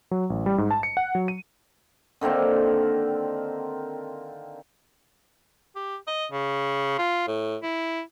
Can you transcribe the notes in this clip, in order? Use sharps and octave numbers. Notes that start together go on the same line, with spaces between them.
F#3
A1
G3
G#2
A5
C#7
F#5
F#3
D#7
D3 D#3 A#3 C4
G4
D#5
C#3
F4
A2
E4